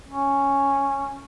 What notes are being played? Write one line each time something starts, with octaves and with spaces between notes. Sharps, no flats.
C#4